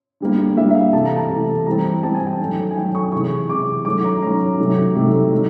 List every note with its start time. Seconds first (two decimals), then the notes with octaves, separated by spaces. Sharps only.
0.20 D3 G3 A#3
0.56 D3 G3 A#3 E5
0.71 E5
0.75 F5
0.93 C3 E3 A3 A5
1.05 A#5
1.16 A5
1.29 C3 E3 A3
1.66 E3 G3 C4 A#5
2.02 E3 G3 C4 A5
2.15 G#5
2.27 G5
2.40 D#3 F#3 A3 C#4
2.71 G#5
2.76 D#3 F#3 A3 C#4 G5
2.95 C#6
3.12 C3 E3 G#3 C#6
3.49 C3 E3 G#3 D6
3.85 D#3 F#3 A3 C#4 D6
4.04 A#5
4.22 D#3 F#3 A3 C#4 A#5
4.59 C3 D#3 F#3 A3
4.95 C3 D#3 F#3 A3
5.32 D#3 F#3